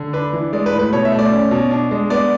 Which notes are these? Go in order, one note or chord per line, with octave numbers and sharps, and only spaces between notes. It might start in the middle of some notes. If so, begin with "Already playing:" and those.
Already playing: D3
D4 B4
E3
G#3 D5
B4
A2
B4
B2 C#5
E5
A3
D5
C#4
B2
D4
G#3
B3 D5